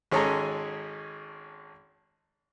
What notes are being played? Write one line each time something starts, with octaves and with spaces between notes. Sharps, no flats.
G#1 G#3 C#4 G#4 A4 A#5